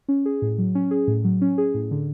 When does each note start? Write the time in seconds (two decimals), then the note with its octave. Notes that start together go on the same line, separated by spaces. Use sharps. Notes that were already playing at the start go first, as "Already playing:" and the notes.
0.08 C#4
0.26 G#4
0.42 A2
0.58 F#3
0.75 C#4
0.91 G#4
1.08 A2
1.24 F#3
1.41 C#4
1.58 G#4
1.74 A2
1.91 D3